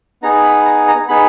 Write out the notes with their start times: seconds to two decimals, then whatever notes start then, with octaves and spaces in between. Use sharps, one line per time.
0.22 B3 D#4 G#4 A#5
0.44 B5
0.65 A#5
0.88 A#5
1.09 B3 D#4 G#4 B5